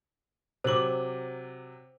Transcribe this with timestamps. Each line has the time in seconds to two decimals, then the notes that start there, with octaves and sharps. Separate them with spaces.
0.64 C3 F#3 C5 D6 F#7